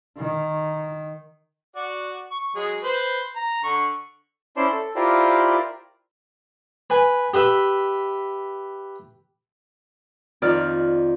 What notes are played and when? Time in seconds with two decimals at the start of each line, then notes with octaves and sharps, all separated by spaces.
0.18 D#3
1.76 F#4 D5
2.31 C#6
2.56 F#3 G#3 G#4
2.83 B4 C5
3.36 A#5
3.64 D3 C#6
4.57 C#4 E4 C5 D5 A5 C6
4.72 A4
4.95 E4 F4 G4 A#4 C5 D5
6.90 B4 G#5
7.34 G4 B4 E5
10.42 F2 D#3 D5 F6